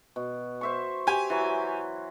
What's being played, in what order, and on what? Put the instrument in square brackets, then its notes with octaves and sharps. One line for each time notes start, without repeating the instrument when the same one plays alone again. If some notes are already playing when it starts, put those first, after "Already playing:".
[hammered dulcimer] B2
C5 E5 C#6
[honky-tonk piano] G4 G#5
[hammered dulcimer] E3 F#3